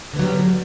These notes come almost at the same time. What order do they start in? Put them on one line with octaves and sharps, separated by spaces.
D3 B3 F#3 G3